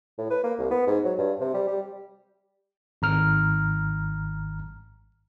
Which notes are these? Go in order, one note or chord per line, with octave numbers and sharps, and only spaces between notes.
A2
B4
A#3
C2
B3
G#2
F#3
G2
C3
G3
G3
G#1 A#5 F6